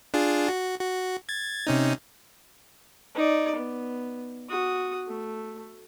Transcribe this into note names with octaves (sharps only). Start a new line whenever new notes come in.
D4 F4 G#4
F#4
F#4
G#6 A6
C3 C#4 D#4
D#4 D5
B3
F#4 D#6
A3